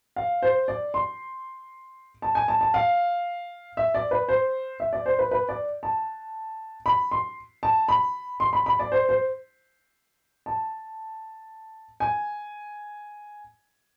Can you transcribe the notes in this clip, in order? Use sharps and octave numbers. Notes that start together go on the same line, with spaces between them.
F5
C5
D5
C6
A5
G#5
A5
A5
F5
E5
D5
B4
C5
E5
D5
C5
B4
B4
D5
A5
B5
C6
A5
B5
C6
B5
B5
D5
C5
C5
A5
G#5